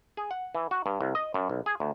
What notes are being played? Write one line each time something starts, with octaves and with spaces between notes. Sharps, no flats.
G#4
F#5
E3
F#4
G2
C2
D#5
F#2
B1
G#4
D2